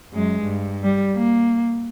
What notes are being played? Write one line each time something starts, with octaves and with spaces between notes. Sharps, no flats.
F#2 G#3
G2
G3
A#3